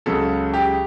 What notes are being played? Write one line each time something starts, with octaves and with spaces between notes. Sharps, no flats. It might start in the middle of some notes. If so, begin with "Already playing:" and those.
C#2 C#3 F#3 A4
G4